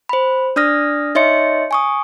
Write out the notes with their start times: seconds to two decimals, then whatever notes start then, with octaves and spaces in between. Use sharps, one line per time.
0.09 C5 B5
0.56 D4 D5 D#6 F6 A#6
1.15 D#4 C#5 D#5 E5 C6 C#7
1.71 G#5 C#6 D#6